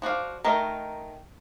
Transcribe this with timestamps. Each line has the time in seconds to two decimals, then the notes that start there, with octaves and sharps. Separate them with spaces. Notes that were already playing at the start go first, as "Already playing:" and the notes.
0.02 F3 F#4 D5 F5
0.45 D#3 A3 D#4 A#4